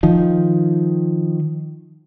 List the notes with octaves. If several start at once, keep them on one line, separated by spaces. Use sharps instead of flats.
D#3 F3